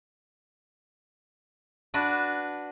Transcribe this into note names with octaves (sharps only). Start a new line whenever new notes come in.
D4 F#4 B4